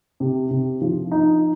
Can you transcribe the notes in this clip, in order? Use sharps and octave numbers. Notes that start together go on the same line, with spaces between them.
C3
C3
F3
D#4